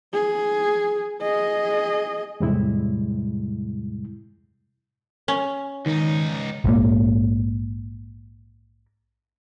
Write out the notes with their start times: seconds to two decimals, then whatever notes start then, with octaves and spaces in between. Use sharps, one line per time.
0.13 G#4
1.22 G#4 D#5
2.40 E2 A2 C3 G3 G#3 E4
5.28 C#4
5.86 C#2 D#3 D#4
6.64 A#1 G#2 A#3